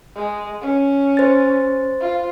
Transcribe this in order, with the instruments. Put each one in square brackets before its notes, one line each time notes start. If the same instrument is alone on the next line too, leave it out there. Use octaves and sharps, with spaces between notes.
[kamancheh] G#3
C#4
[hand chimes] C5 A6
[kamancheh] F4